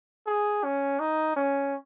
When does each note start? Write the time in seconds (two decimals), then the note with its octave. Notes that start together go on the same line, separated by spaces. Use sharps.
0.27 G#4
0.64 C#4
1.00 D#4
1.37 C#4